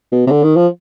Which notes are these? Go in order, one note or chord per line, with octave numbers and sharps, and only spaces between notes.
B2
C3
D3
D#3
F3